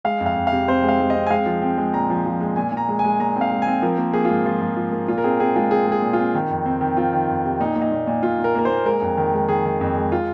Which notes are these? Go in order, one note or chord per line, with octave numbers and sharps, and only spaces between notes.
G#3 F5
F2
F5
F2
F5
C3
C4 C5
G#3
F5
G#3
C4 D#5
G#5
G#3 F5
F3
C4
G#3
A#2 A#5
F3
F3
G#3
A#2 G#5
A#2
A#5
G#3
G#5
G#3
A#2 A#5
C4
F5
G#3
C4 G#5
F3 A#4
A#3
A#3 G#4
F4
G#2
F3 F4
G#2
F3
A#3
A#2 F4
A#4
C4 G#4
C4 G#4
G#3 F4
C4 G#4
G#3 G#4
A#2
F4
C4
D#3
F2
C4
D#3
C4 F4
D#3
F2
C3
A#2 D#4
A#2
D#4
A#2
A#2
A#2 F4
A#2
A#4
A#3 A#4
A#2 C5
G#3 A#4
F2
D#3
G#3
D#3 G#4
D#3
F2
G#3
F4